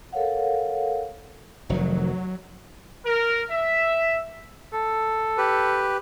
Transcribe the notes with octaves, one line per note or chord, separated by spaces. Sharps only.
A4 A#4 C#5 F5 F#5
F1 A#2 D#3 F#3
A#4
E5
A4
G4 B4